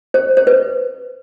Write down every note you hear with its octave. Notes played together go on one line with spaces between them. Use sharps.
C5
C5
B4